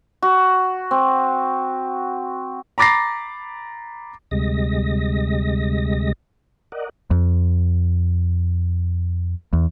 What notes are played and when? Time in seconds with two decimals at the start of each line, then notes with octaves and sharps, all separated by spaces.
0.22 F#4
0.91 C4
2.78 A#5 B5 D6 A6 A#6 C7
4.31 D2 C3 G3 G#3 D#5 A#6
6.72 A#4 D5 D#5 F#5
7.11 F2
9.53 E2